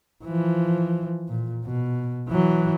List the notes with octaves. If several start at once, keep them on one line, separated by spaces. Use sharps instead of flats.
E3 F3
A#2
B2
E3 F#3